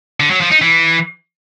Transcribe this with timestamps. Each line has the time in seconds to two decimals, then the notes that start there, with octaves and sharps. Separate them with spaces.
0.20 D3
0.30 F#3
0.41 F3
0.51 D#4
0.62 E3